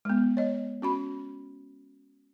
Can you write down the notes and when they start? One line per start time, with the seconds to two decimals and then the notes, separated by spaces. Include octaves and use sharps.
0.05 G#3 B3
0.37 C#5 D#5
0.82 C#4 F#4 B5